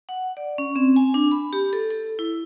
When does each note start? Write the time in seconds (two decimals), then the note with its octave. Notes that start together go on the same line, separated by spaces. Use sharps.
0.09 F#5
0.37 D5
0.58 C#4
0.76 C4
0.96 G#5
1.14 D4
1.31 B5
1.53 G4
1.73 A4
1.91 A4
2.19 E4